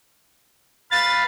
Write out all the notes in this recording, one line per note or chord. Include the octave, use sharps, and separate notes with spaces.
B4 F5 A6